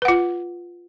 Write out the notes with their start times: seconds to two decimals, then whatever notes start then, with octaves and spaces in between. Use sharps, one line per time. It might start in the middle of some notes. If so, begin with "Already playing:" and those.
0.02 B4
0.05 F#5
0.08 F4